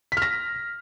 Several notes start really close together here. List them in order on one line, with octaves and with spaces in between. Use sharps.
B6 F6 A#6